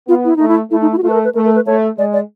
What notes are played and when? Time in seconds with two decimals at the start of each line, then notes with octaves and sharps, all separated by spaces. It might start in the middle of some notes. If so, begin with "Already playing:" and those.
0.08 B3 F4
0.25 E4
0.36 A3 D#4
0.48 E4
0.71 A3 E4
0.82 D#4
0.93 E4
0.98 F#4
1.03 A3 F4
1.10 B4
1.14 A#4
1.24 B4
1.35 A3 A#4
1.45 A#4
1.55 B4
1.66 A3 C#5
1.98 G#3 D5
2.13 D5